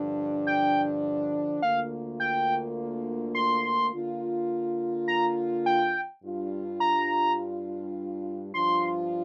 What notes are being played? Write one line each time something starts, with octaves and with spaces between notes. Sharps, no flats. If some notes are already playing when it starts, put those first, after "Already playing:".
Already playing: G2 D3 F3 D4
G5
D2 D3 A#3 F4 F5
G5
C6
D3 A#3 F4
A#5
G5
G2 G3 D4 F4
A#5
G2 F3 D4 F4 C6